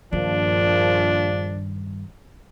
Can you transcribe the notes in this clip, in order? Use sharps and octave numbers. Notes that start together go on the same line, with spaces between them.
A#1 G2 D#3 F3 D4